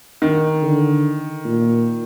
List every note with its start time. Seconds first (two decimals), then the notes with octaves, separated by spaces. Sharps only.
0.22 D#3
0.62 D3
1.45 A#2